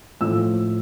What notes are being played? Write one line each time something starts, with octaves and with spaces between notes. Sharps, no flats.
A2 F3 E6